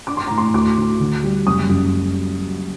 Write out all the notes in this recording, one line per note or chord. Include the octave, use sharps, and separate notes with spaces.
D4 D6
C6
A2 A#5
C6
D2 D6
D2
D3
G3
F#1 D#6
F#2